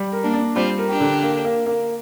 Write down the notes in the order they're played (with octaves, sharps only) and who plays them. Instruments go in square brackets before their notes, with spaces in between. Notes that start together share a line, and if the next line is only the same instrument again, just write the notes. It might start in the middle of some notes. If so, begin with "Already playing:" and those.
Already playing: [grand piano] G3
A#4
[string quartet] A#3 D4
[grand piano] D4
[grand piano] G3 [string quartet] C4 F4
[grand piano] A#4
[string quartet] D4 G4
[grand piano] D3
A#3
A#3
A#3